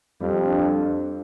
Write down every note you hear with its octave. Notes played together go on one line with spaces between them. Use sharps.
F2 G3
D4